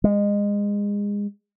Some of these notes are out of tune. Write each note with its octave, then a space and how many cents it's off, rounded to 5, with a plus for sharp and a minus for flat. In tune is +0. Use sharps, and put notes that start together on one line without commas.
G#3 -25